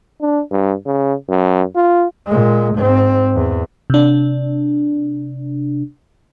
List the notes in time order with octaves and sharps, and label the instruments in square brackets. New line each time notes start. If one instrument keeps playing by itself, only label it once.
[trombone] D4
G2
C#3
F#2
F4
[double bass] A#2 G#3
G#2 C4
E2
[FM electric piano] C3 D4